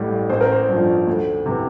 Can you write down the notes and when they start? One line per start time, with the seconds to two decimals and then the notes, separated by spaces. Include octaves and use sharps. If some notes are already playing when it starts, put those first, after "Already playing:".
Already playing: A1 A2 G3
0.30 A1 C5
0.41 A#4
0.52 C5
0.68 G2 F3
1.07 D2
1.46 C3 E3